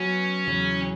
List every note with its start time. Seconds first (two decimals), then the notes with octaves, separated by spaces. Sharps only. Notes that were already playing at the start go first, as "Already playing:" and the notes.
Already playing: F#3 B3 C#4 F#4 B4
0.47 E2 C#3 F#3